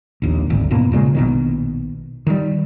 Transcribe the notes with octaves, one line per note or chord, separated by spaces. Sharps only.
A#1 D#2
D#1 G#1 D2
E1 G#2 B2 A#3
A#2 C#3 G#3
A#1 B2 D#3
D#3 G3